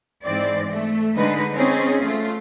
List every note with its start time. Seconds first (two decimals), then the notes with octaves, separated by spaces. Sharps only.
0.22 G#2 E3 C4 D5
0.70 A3
1.15 D3 G#3 D#4 B4
1.53 C4 C#4 D#4 G#4
2.00 A3 F4